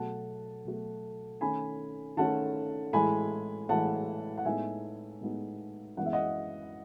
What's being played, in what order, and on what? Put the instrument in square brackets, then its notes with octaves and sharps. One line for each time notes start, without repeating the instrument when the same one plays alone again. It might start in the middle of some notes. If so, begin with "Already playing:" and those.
Already playing: [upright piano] B2 F#3 A3 F#5 A5
B2 F#3 A3
D#3 A3 C#4 G#5 B5
D#3 A3 C#4 F#5 A5
A2 E3 G#3 G#5 B5
A2 E3 G#3 F#5 A5
F#5
A2 G#3 B3 D#4 E5 G#5
A2 G#3 B3 D#4
F#2 E3 G#3 B3 F#5
E5
D#5 F#5